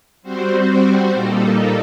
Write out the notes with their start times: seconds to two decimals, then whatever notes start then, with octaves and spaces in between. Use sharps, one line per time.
0.22 G3 C4 F#4 C5
1.13 A#2 G3 A#3 D#4 A4